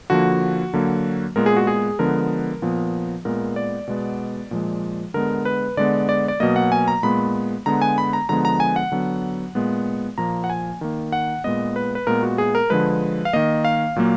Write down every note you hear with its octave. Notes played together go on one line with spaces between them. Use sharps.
D3 F3 A#3 F#4
D3 F#3 A#3
A#2 G#3 B3 A#4
G#4
F#4
G#4
D3 F3 G#3 B3 A#4
A#2 F3 B3
A#2 G#3 B3 A#4
D5
B2 G#3 B3
A#2 F3 G#3
D3 G#3 B3 A#4
B4
D3 G#3 B3 D5
D5
D5
B2 F#3 A#3 D#5
F#5
G#5
A#5
A#2 G#3 B3 B5
D3 G#3 B3 A#5
G#5
B5
A#5
D3 F3 G#3 B3 A#5
A#5
G#5
F#5
D3 F#3 B3
A#2 G#3 B3
A#2 F3 A#3 A#5
F#5
G#5
D#3 A#3
F#5
A#2 G#3 B3 D#5
B4
B4
A#2 G#3 B3 A#4
F#4
G#4
A#4
D3 F3 G#3 B4
F5
D#3 A#3 D#5
F5
A#2 F#3 A#3